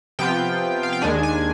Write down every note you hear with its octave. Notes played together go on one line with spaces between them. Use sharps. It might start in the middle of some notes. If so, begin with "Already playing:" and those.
C3 F3 B3 F4 G5
F5
G5
D#2 D#3 G#3 D4 G#5
G#5